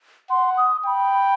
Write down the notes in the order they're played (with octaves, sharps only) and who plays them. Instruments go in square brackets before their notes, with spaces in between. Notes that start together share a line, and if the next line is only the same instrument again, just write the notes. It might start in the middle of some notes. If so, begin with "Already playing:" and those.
[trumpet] F#5 [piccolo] C6
[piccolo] D#6
[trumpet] G5 [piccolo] B5